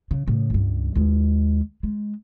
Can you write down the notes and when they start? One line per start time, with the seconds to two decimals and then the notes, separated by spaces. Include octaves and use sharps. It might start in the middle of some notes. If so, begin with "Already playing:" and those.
0.11 C#3
0.28 A2 C#3
0.50 C#2 G2
0.95 D#2 G#3
1.83 G#3